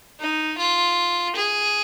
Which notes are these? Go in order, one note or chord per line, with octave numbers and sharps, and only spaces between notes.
D#4
F4
G#4